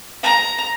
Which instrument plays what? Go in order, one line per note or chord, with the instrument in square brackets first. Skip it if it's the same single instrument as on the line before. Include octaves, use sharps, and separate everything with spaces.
[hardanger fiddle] A#5